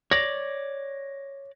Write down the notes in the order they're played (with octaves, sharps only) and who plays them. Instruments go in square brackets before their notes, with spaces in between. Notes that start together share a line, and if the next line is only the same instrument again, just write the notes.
[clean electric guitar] C#5 D5 [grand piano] A#6